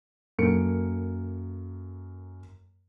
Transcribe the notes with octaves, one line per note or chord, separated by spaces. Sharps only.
F#2 A#3 A4 C#7 D7